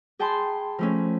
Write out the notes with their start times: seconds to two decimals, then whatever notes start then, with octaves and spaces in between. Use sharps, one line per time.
0.19 G#4 G5 A5 B5 C6
0.79 F3 A3 C#4